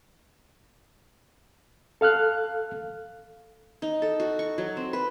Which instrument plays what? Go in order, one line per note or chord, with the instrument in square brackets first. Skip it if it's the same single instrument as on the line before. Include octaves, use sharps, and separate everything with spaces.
[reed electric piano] A4 F5 F6 F#6
[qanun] D#4
A4
F#4
C#6
F#3
C4
B4